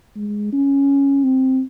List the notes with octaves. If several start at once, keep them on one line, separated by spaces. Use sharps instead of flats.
G#3
C#4
C4